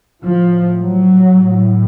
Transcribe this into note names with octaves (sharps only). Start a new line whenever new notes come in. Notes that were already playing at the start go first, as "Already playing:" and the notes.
A2 F3
F#3
A2